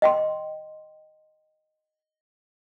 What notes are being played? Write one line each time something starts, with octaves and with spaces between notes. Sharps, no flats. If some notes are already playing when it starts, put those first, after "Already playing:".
D#5 G5 C6